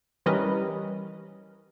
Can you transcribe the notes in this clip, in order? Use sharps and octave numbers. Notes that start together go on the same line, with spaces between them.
E3 G3 C#4 A#4 B4 D#5